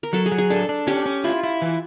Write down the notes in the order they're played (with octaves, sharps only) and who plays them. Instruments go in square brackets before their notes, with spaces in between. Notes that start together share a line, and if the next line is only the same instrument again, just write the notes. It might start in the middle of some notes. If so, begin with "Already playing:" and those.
[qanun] A#4
[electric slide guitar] F#3 [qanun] A4
[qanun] G#4
[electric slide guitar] F#3
[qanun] G#4
[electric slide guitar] D4 [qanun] A4
[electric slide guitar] D4
[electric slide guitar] C#4 [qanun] G4
[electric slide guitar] C#4
[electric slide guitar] E4 [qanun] F4
[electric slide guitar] E4
E3